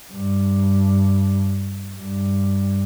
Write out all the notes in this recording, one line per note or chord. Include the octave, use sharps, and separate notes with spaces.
G2
G2